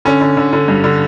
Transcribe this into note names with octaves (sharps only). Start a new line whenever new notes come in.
D3 C#4
D3
D3
D3
G2
D3